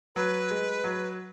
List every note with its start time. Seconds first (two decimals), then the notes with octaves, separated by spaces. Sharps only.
0.16 F#3 B4
0.51 G#3
0.84 F#3